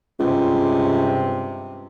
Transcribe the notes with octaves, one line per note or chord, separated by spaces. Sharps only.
C#2 G2 C3